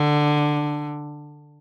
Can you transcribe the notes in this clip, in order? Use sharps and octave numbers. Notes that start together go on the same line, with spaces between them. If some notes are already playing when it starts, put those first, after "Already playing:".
Already playing: D3